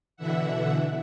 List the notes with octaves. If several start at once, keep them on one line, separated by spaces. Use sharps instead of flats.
B2 D3 E3 E5 F#5